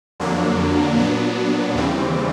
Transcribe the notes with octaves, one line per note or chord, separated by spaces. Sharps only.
F2 D3 F#3 A#3 D4
A#2 F#3 B3 D4
D#2 C#3 E3 G3 C4